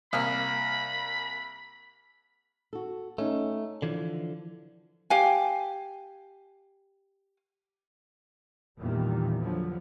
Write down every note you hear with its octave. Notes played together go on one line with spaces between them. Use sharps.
C2 A#3 B5 F6
F#4 A4
A3 C#4 D#4
D3 E3 F3
G4 F5 G#5
E2 A#2 D#3 E3 G3
D3 F3 F#3 B3